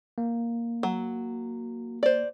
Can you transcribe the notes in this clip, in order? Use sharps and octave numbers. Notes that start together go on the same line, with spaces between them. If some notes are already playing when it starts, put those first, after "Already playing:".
A#3
F#3
C5 D5